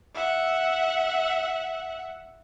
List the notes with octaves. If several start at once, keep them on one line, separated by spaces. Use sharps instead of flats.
E5 F#5